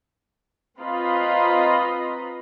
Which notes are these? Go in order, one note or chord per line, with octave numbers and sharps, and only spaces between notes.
C4 F4 B4 D#5 A#5 B5